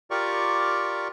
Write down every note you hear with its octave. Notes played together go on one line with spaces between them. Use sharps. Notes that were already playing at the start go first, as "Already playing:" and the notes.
F4 G4 A#4 D5 C#6